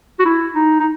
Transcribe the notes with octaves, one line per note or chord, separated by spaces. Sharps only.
F#4
E4
D#4
D#4